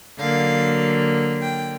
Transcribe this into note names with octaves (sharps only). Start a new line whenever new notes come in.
D3 F#3 A#3 F5
G5